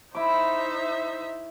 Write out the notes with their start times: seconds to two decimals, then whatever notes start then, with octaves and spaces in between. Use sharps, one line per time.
0.15 D#4 E4 C5 E5 D6